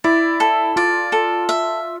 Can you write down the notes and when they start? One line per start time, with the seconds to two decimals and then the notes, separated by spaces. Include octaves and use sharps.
0.04 E4 D5
0.40 A4
0.76 F4 D5
1.12 A4
1.49 E5